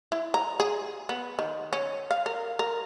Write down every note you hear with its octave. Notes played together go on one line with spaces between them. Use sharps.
E4
A#5
G#4
B3
D#3
C#4
F5
A#4
A#4